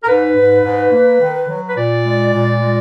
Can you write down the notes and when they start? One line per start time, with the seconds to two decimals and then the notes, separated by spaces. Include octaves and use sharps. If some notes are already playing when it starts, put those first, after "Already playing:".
0.03 A#4
0.08 G#2 B4
0.36 G#2
0.64 G#2
0.92 A#3
1.21 D#3
1.49 F#3
1.68 B4
1.77 A#2 D5
2.05 G#3
2.32 A#2
2.60 G#3